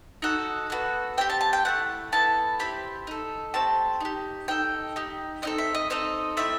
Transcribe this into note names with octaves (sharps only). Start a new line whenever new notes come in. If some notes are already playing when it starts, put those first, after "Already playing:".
D#4 F#4 A4 F#5
B3 F#4 A4
C4 E4 G4 G5
A5
A5
G5
A3 C4 E4 F#5
B3 E4 A4 A5
C4 E4 G4 B5
D#4 A4
A3 C4 G4 A5
D#4 G4
D#4 A4 G5
D#4 G4
C4 D#4 A4 D#5
E5
D#5
C4 D#4 A4 D#5
A3 C4 E4 E5